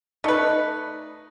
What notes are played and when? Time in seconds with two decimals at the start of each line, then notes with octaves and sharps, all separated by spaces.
0.24 A3 D#4 B4 D5